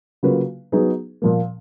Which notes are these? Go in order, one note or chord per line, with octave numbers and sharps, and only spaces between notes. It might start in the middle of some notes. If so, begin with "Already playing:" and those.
C#3 F#3 A#3 F4 B4
F#3 B3 D#4 G#4 B4
A#2 F3 A#3